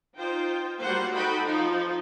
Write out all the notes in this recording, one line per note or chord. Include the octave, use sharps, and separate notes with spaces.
D#4 F4 C5 G5
F#3 G3 A#3 F#4 C5 F#5
D#4 F#4 A4 D#5 G5 B5
F3 D#4